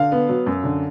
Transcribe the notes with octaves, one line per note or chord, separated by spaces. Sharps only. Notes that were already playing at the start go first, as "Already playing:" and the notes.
Already playing: D3 F5
B3
F#3
F#2
D3